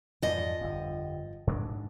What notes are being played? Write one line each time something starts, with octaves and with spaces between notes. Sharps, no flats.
F2 G#2 E3 F3 D#5
G1 F2
G#2 G#3 D4